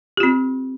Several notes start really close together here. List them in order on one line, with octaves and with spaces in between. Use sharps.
G4 F4 C4